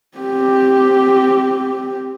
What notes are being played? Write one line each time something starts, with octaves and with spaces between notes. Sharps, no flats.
C4 G4